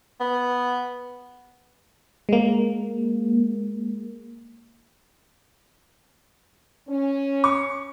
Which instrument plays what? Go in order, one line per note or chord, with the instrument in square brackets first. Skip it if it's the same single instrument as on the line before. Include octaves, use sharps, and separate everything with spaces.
[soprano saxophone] B3
[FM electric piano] G#3 A#3
[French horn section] C#4
[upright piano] C#6